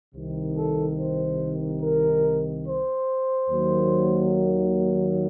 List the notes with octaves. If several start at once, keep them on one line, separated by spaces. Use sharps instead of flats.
C2 C3 D#3
A4
C5
A#4
C5
D#2 D#3 F#3 A#3